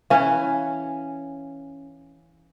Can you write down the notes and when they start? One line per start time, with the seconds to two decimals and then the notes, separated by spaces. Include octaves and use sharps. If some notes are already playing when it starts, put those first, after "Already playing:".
0.10 E3 C#4 F5 G#5